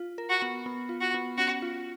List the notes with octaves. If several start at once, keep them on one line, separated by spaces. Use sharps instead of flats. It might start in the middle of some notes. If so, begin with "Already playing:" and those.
Already playing: F4
A#4
F#4
B3
B3
F4
F#4
B3
C#4 F#4
F4